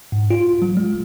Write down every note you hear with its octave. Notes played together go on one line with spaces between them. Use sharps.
G#2
F4
F#3
G#3